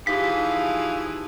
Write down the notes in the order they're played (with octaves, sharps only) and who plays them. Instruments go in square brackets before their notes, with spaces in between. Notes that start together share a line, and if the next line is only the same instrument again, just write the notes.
[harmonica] E3 F3 G#4 [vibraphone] D#4 G4 [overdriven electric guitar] F5 [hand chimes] B6